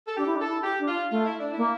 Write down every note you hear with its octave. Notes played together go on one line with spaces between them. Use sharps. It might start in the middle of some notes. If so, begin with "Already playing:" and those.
A4
D4 G4
E4
D4
A4
E4
G4
D4
F4
A3 F4
E4
D4
E4
A#3